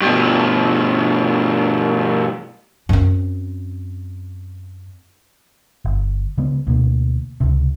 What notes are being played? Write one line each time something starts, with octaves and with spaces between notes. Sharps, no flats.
G2 B2
F#2 C4
G1
C#3 G#3 B3
D2 B2 A#3
C#2 C3